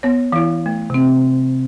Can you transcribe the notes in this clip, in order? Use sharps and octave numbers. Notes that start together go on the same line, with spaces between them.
B3 C#5
E3 E4 F5
A3
C3 C4